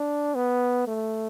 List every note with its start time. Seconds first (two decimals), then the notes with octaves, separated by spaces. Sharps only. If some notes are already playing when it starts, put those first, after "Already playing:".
Already playing: D4
0.35 B3
0.87 A3